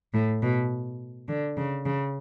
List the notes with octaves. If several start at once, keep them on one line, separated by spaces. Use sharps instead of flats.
A2
B2
D3
C#3
C#3